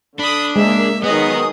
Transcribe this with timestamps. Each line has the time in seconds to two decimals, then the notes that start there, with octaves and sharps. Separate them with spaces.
0.19 D3 D4 B5 D#6
0.56 G#3 A#3 G#4 E5
1.03 D#3 F#3 B3 G#4 D#5 D#6